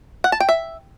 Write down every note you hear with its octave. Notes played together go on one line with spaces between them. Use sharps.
F#5
A5
G5
E5